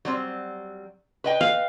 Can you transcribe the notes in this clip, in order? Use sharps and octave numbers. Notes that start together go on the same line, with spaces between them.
F#3 G3 C4
B4 D#5 G5
F5